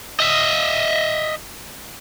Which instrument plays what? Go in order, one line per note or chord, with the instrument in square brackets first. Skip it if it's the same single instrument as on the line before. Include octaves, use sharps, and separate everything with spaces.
[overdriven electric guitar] D#5 E5